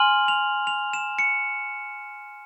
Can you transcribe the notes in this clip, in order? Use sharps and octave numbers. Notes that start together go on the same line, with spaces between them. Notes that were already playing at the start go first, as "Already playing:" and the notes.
Already playing: G#5 C6 F6 F#7
F7
F7
E7
C#7